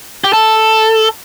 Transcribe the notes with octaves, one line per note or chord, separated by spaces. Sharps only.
G4
A4